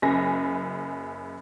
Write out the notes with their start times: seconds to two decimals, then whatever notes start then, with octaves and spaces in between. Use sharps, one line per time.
0.02 F#1 F#2 C#3 G#5 A#6